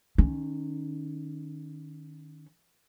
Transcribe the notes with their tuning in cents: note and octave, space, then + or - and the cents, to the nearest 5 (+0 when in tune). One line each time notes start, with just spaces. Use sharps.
D#3 -25 C#4 +5